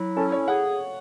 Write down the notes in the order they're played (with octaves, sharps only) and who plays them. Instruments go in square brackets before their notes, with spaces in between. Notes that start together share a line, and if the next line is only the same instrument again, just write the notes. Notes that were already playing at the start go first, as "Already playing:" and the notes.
Already playing: [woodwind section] F#3 E4
[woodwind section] C#4 [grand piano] A4
[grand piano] C#5
[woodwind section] G#4 [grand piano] F#5